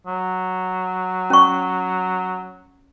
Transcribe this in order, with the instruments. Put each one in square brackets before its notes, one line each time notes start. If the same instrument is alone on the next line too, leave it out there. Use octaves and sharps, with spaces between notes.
[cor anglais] F#3
[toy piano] C#4 C#6